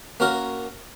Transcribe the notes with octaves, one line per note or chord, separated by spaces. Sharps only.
A#3 C#4 F#4 A#4